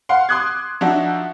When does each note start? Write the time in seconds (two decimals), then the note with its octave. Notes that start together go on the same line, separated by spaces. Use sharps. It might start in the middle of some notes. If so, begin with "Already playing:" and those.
0.09 F5 F#5 C6
0.29 C6 D6 D#6 F#6 G#6
0.81 F3 D4 D#4 F#4 E5